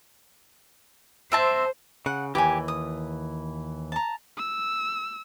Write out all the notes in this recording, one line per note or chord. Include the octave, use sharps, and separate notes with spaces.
C4 C5 E5 A5
C#3 F#5
D#2 G#2 E3 G4 G#5
D#6
A5 A#5
E6